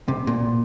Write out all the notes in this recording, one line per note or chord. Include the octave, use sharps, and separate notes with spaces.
C3
A#2